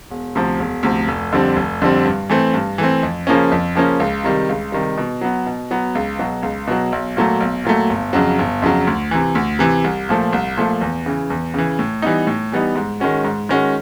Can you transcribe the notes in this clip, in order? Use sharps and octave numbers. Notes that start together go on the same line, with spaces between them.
E1
D2 C3 F3
E1
D2 C3 F3
F1
F2 D3 G3 C4
F1
F2 D3 G3 C4
G2
E3 A3 C4
G2
E3 A3 C4
F2
C#3 F3 A#3 C#4
F2
C#3 F3 A#3 C#4
C#2
C3 D#3 G3
C#2
C3 D#3 G3
B2
F#3 B3
B2
F#3 B3
C#2
B2 F#3
C#2
B2 F#3
B1
A#2 F#3 A3
B1
A#2 F#3 A3
G1
F2 C#3 F#3
G1
F2 C#3 F#3
D2
C3 E3
D2
C3 E3
C2
A#2 F3 A3
C2
A#2 F3 A3
E2
C#3 E3
E2
C#3 E3
A2
E3 G3 B3 D#4
A2
E3 G3 B3 D#4
G#2
D#3 G#3 C#4 F#4
G#2
D#3 G#3 C#4 F#4